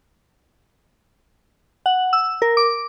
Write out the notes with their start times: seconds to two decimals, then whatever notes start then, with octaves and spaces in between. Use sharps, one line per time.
1.86 F#5
2.13 E6
2.42 A#4
2.57 D6